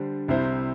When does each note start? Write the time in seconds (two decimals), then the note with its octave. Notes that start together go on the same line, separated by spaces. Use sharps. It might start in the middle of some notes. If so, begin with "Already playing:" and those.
Already playing: D3 G3 D4 C5
0.28 C2 C3 G3 E4 C5